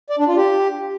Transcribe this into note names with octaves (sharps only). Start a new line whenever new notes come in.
D5
D4
F4
G4